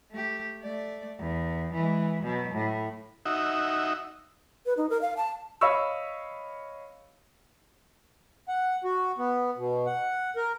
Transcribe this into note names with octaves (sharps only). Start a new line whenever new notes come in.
A3 G4
A3 D5
E2
E3 G#3
B2 F#3
A2
D#4 F#4 E5
B4
D#4
A#4
F5
A5
C#5 D#5 F5 B5 C#6 E6
F#5
F#4
B3
B2
F#5
A#4